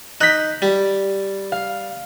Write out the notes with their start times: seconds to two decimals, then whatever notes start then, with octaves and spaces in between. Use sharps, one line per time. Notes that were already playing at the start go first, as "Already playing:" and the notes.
0.21 D#4 F#6 G6 B6
0.62 G3
1.52 F5